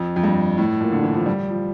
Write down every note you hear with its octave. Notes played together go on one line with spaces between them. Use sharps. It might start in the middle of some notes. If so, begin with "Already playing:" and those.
Already playing: F2
F2
G2
A2
A#2
D3
E3
F3
G3
F3